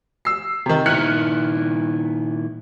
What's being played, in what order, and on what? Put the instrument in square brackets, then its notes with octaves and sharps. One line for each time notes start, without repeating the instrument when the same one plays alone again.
[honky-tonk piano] E6 C7
C3 D#3
[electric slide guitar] A#2 D#3 E4 [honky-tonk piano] F6 F#6 C#7